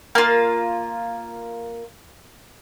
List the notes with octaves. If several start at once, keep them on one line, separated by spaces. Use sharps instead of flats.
A#3 F4